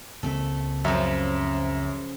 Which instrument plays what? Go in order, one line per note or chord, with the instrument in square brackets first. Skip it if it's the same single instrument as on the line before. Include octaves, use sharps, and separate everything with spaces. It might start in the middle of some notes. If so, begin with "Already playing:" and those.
[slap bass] C#2 A#3 C4 [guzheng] A3 A4
[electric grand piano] F#2 E5 [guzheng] C#3 F3